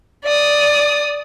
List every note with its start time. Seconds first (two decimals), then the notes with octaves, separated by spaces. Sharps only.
0.24 D5 D#6